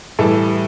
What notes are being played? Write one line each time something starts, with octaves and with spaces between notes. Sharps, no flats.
A2 E3 G3 A4